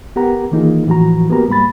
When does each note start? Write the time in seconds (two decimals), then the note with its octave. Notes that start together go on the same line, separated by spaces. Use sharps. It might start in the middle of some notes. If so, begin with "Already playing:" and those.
0.16 B3 G4 A#4 F#5 A#5
0.51 D#3 E3 A#3 D#4 F4 G#4
0.87 A2 E3 F3 F#4 A#5
1.29 A#3 B3 F#4 G4 A#4 A#5
1.48 G#2 G3 A#3 B5 A6